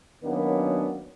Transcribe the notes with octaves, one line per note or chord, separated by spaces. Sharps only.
D#3 F#3 A#3 B3 C#4 D4